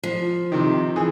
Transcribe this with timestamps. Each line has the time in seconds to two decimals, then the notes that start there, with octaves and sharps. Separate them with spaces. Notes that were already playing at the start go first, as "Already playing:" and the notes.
0.03 F3
0.52 C3 D#3
0.96 E3 G#4